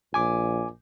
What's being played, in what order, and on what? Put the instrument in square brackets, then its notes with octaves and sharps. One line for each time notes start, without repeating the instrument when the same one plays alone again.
[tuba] A#1 [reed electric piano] G#5 D6